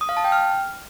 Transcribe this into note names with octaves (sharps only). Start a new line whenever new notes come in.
D#6
F5
A5
G5
F6